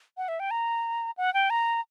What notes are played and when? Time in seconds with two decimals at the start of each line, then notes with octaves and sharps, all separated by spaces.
0.17 F#5
0.28 E5
0.40 G5
0.51 A#5
1.18 F#5
1.34 G5
1.50 A#5